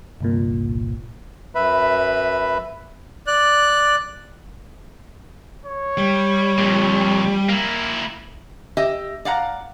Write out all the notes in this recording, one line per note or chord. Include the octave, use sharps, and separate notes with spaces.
G1 C2 A#2
F#2 B4 E5 B5
D5 F#6
C#5
G3
F2 A#2
A#3 E4
G4 D#5 E5
D5 F5 F#5 A#5